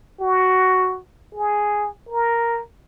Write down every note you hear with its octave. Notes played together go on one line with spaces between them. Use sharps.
F#4
G#4
A#4